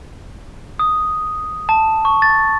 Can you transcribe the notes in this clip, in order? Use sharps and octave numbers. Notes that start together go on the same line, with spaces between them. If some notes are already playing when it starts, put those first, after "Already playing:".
D#6
A5
C#6
A6